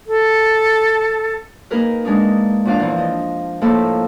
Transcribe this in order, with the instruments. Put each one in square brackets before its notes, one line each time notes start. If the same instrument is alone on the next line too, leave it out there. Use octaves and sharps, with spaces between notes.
[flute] A4
[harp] A#3 D#4 G#4 A#4 B4
G#3 D4 D#4
E2 A#2 D4 D5 F5
E3 F3
D#5
A2 F3 A#3 A4 E6